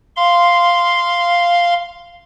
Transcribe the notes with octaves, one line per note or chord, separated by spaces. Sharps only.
F5 C6